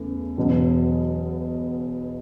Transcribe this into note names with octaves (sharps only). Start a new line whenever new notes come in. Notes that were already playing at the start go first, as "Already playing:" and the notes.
Already playing: E2 C#3 A3
E1 E2 B2 F#3